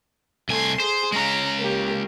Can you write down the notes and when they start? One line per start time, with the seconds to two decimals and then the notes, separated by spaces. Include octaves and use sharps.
0.49 C2 A3 G#5 C6
0.80 G#4 C5
1.12 G#3 C#4 A#5
1.59 A#3 G4